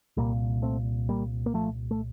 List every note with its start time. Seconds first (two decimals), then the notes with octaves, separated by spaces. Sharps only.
0.17 C2 A#2 G3 A#3
0.62 A3 C4
1.09 G3 A#3
1.46 A#3
1.54 F3 A3
1.91 A3